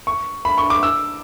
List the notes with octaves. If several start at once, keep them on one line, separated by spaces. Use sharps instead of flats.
C#6
B5
C#6
D6
E6